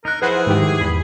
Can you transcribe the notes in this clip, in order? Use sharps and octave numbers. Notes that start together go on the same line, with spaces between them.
D#4 A#4 F#6
F3 E4 G#4 B4 C5 F#5
G#2 D#3 G4
E2 B5